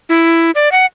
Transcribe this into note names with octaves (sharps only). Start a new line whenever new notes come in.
E4
D5
F#5